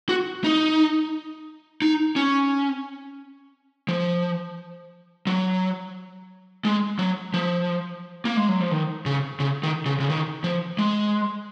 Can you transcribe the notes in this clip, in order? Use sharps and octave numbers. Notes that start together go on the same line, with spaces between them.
F#4
D#4
D#4
C#4
F3
F#3
G#3
F#3
F3
A#3
G#3
F#3
F3
D#3
C#3
C#3
D#3
C#3
C#3
D#3
F3
G#3